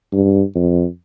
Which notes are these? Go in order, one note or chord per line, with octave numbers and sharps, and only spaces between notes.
G2
F2